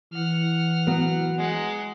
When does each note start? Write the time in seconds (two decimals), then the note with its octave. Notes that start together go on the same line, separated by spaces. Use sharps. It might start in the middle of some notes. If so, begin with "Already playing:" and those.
0.13 E3 F#5 F6
0.87 F#3 B3
1.38 G#3 F#5